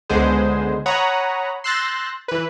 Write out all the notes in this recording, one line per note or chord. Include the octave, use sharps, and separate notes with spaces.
C#2 D3 G#3 B3 G#4 C5
C#5 F#5 A#5 B5 D#6
C6 E6 F#6 G6 A6 A#6
E3 B4